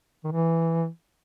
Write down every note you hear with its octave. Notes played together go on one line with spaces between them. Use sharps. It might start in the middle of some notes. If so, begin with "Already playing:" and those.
D#3
E3